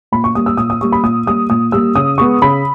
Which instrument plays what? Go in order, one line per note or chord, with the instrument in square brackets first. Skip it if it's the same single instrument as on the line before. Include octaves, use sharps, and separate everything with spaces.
[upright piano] A#2 B5
C#6
G3 A#3 D#6
E6
A#2 D#6
D#6
G3 A#3 C#6
B5
A#2 D#6
G3 A#3 D#6
A#2 D#6
G3 A#3 E6
C#3 D#6
G#3 B3 C#6
C#3 B5